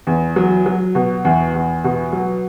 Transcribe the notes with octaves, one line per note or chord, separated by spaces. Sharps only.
E2
F#3
F#3
B2
E2
E2
B2
F#3